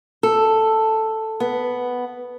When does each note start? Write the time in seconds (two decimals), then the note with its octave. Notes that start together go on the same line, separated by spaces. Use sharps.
0.23 A4
1.40 B3